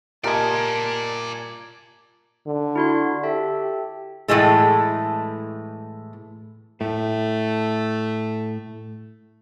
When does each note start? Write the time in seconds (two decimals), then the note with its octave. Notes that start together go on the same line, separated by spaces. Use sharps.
0.24 A#2 G4 A#4 D5 D#5 G#5 A5
2.47 D3
2.76 E4 F#4 C6
3.23 G4 A4 E5 A5
4.28 A2 E3 G#3 A3
6.81 A2 A3